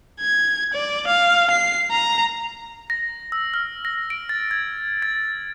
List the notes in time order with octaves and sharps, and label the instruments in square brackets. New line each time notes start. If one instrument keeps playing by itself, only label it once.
[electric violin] G#6
D5
F5
C7
A#5
[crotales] A#6
E6
F6
A#6
D7
A6
G#6
A6